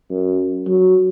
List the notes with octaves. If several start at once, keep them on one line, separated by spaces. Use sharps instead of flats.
F#2
F#3